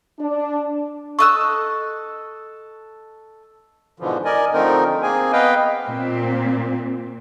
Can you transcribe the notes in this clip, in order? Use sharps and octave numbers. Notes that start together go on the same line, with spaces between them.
D4
A4 D#5 C#6 E6 F#6
G#2 B2 D3 E3 F3
A#4 D5 D#5 G#5
D3 F3 A3 C4 D#4 A#4
A#3 C4 G#4 G#5
B3 B4 D#5 F5 G5
A#2 C4